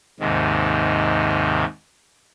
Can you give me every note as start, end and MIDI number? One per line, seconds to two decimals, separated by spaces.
0.20 1.64 39
0.20 1.64 44
0.20 1.64 48
0.20 1.64 51